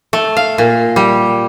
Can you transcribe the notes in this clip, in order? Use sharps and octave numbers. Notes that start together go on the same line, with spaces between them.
A3
F5
A#2
G3